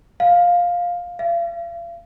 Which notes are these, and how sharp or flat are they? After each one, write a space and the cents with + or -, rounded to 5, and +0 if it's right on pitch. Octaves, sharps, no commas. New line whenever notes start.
F5 +10
F5 -40